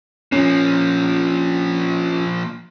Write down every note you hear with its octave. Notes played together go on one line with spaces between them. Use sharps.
A#2 F3 C#4